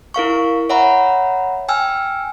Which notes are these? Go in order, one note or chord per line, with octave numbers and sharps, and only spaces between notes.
E4 A#4 F5 C#6
C#5 E5 F#5 A#5 B5
G5 G#5 E6 F6